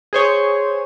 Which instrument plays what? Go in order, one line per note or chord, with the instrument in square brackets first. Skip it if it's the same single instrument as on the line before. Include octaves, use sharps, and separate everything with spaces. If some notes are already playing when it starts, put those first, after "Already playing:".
[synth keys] G#4 C5 C#5